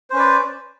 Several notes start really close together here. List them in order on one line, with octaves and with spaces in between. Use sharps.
C5 C#4 B4 D5